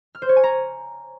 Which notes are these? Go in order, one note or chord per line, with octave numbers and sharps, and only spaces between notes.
F6
C5
C#5
G#5
A#5